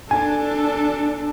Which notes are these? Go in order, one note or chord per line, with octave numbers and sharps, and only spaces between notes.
D4 A4 G#5